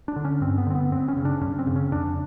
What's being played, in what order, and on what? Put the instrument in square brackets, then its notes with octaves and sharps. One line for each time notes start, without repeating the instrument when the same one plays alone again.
[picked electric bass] D4
D3
C#4
G2 C4
B3
D3 C4
B3
F#2 C4
C#4
C#3
D4
F#2 C#4
C4
C#3
C#4
F2 D4